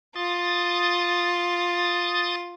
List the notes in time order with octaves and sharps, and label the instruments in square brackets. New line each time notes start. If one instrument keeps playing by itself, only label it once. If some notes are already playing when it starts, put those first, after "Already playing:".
[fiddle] F4 [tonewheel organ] D#6 A6